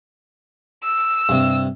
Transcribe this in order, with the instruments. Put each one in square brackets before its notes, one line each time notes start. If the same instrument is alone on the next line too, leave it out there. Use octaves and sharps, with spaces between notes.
[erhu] E6
[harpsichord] G2 C3